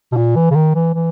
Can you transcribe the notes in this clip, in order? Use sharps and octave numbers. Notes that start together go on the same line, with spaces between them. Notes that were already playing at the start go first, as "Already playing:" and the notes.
B2
A#2
E3
C#3
D#3
E3
E3